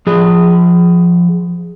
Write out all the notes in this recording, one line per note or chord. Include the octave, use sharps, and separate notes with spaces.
F3 G#4